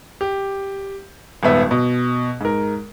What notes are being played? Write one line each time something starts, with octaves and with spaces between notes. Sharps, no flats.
G4
D#1 G#1 B3 E5
B2
G#2 A#4